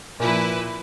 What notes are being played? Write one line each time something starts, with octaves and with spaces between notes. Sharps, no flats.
A#2 F3 E4 B4